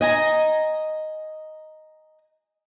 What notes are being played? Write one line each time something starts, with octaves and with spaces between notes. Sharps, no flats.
D#5 G#5 A#5